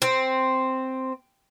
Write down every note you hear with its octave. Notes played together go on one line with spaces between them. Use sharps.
C4